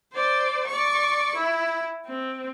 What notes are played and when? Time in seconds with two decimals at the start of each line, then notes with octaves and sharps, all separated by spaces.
0.13 C5 D5
0.67 D5 C#6
1.35 E4
2.06 C4